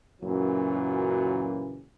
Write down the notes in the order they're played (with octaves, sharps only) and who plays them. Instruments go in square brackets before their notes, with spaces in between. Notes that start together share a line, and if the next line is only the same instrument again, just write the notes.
[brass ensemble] F#2 A#2 C#3 E3 F#3